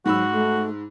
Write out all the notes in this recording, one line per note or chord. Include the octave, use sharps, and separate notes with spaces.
G#2 F#3 F#4 B5 E6
A3